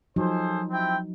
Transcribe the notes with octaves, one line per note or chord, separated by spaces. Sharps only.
F3 F#3 D#4 G#4 A4 C5
C4 E4 G5